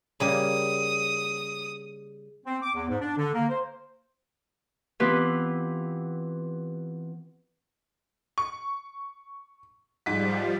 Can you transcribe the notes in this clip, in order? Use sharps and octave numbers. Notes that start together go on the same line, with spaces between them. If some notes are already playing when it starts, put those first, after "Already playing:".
C#3 G3 A#3 D#6
C4
D6
E2
G#2
D4
D3
A#3
C5
E3 B3 C4 F4 G4 B4
C#6
G#2 F3 G3 B6